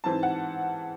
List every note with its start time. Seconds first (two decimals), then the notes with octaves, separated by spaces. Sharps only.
0.04 G#2 E3 C4 A5
0.23 F#5